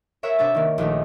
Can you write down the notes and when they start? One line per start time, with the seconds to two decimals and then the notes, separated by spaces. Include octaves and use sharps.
0.23 A#4 C#5 E5 F#5 E6
0.38 C3 D4 C#5 E5 A6
0.55 D#3 A#3
0.78 A#1 D#3 A3 D#4